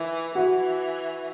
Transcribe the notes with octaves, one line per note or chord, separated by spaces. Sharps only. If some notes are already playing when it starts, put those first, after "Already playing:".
Already playing: E3
E3 F#4